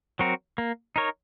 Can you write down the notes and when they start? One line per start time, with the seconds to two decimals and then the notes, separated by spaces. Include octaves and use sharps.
0.19 F#3 C4 F#4 A#4
0.58 A#3
0.96 D#4 A#4 C#5